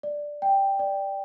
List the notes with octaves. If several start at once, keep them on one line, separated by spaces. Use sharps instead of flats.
D5
G5
D5